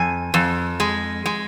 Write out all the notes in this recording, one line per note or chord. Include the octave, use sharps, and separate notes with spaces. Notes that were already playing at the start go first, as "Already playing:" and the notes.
Already playing: F2 G#5
F2
G#3
G#3